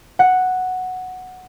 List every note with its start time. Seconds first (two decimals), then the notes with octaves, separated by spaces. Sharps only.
0.19 F#5